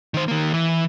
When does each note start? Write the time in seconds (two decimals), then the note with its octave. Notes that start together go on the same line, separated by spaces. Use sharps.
0.14 D#3 C5
0.28 D#3 A#3
0.54 E3